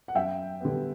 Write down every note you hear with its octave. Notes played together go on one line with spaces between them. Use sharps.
F#5
F#2 E5 G5
D3 G3 B3